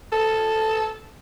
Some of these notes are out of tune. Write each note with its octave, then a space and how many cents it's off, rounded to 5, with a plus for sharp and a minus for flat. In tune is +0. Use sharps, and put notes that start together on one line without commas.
A4 +0